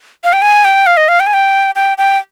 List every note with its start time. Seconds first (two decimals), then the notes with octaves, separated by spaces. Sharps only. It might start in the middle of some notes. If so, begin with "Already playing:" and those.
0.24 F5
0.33 G5
0.42 G#5
0.65 G5
0.86 F5
0.97 D#5
1.08 F5
1.20 G5
1.27 G#5
1.34 G5
1.76 G5
1.98 G5